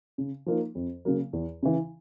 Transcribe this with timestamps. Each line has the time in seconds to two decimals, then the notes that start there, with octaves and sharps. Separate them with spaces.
0.18 C#3
0.46 F3 A#3 D#4
0.75 F2
1.05 C#3 F#3 A#3
1.33 E2
1.63 C#3 E3